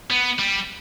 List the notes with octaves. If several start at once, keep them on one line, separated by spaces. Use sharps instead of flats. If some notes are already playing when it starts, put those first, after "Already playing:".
B3
G3